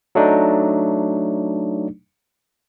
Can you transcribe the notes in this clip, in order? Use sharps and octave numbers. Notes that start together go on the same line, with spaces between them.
F#3 A3 D4 D#4